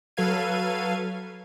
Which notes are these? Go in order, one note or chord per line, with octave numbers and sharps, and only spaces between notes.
F#3 A4 B4 F5 G#6 D#7